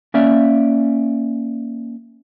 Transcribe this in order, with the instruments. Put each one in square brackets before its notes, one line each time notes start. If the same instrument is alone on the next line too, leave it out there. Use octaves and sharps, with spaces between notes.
[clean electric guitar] A#3 C#4 D5 E5